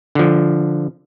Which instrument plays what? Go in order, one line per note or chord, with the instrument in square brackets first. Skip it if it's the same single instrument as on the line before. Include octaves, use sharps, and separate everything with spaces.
[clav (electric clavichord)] D3 F3